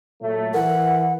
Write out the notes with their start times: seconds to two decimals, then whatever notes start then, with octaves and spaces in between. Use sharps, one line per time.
0.21 A#2 F#3 A3
0.54 E3 A#4 F#5